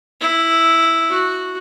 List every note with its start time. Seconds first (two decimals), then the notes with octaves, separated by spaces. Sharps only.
0.20 E4
1.09 F#4